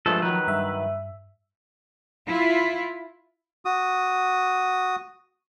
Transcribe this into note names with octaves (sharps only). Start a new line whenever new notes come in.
G2 F3 G#3 A3 A4
D#3 F#3 B4
G2 E5
E4 F4
F#4 D#6